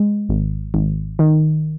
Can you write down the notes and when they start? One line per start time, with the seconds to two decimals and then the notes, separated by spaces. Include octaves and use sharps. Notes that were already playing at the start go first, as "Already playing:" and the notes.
Already playing: G#3
0.29 G#1
0.74 G#1
1.19 D#3